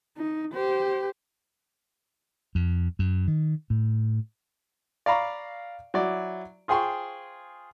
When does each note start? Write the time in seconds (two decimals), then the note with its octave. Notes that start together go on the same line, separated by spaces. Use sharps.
0.18 D#4
0.53 G4 C5
2.55 F2
2.99 F#2
3.28 D#3
3.70 A2
5.06 D5 F5 A#5 B5 C#6
5.94 F#3 E4 D5
6.68 F4 G#4 C5 G5 C6 C#6